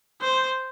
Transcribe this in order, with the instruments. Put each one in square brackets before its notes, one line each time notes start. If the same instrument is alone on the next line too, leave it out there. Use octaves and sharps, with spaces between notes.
[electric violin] C5